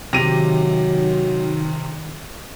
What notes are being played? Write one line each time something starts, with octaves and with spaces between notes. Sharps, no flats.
C3 D#3 F#3 G4 A#6 D#7 F7